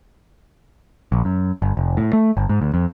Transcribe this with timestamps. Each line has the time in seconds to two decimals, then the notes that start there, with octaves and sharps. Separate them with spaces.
1.12 A#1
1.25 F#2
1.62 G1
1.77 F1
1.97 A2
2.13 A3
2.37 G1
2.49 G#2
2.62 D2
2.74 F2